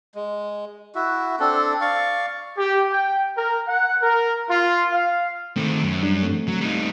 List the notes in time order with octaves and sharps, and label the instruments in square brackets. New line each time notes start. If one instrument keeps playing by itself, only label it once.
[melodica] G#3
E4 F#4 E5
C4 D4 A4
D5 F5 C#6
[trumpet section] G4
G5
A#4
F#5
A#4
F4
F5
[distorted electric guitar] D#3 C4 [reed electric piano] A3
[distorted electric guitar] F#2
[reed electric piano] G3 D4
A3 C4
[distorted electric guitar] F#3
G3 D#4